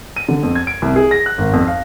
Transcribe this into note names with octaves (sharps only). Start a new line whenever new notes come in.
D#7
D3
F2
G#6
D7
C2
G#4
A#6
F#6
G#1
F2
F5